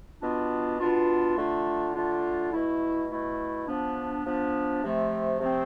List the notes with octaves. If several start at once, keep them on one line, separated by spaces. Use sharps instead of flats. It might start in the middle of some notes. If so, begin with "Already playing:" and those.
B2 B3 D4 F4
B2 B3 D4 F4
D3 A3 D4 F4
D3 A3 D4 F4
B2 A3 E4
B2 A3 E4
F3 B3 D4
F3 B3 D4
C3 F3 A3 C4
C3 F3 A3 C4